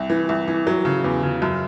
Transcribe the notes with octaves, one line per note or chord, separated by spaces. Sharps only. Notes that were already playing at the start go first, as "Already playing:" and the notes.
Already playing: C2
E3
C2
E3
F#3
C#3
E2
C#3
F#2